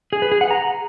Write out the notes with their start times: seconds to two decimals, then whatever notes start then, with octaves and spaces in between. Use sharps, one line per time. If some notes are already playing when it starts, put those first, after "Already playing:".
0.13 G#4
0.22 B4
0.32 G#4
0.41 F#5
0.51 A#5